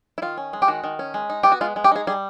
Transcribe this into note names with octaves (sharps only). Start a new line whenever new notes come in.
E4
D#3 F4
C#4
G#3
G4
D#3 F#4
D#3
C#4
G#3
D#4
B3 G4
F#4
G#3 F4
G#3
G4
D#4 G#4
G3 G#4